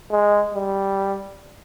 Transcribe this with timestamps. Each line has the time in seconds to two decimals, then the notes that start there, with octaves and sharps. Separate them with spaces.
0.11 G#3
0.54 G3